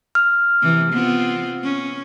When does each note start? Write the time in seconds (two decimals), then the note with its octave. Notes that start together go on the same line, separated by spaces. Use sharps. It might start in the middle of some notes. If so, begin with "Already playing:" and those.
0.15 F6
0.62 C3 E3
0.93 B3 C4 F4
1.64 C#4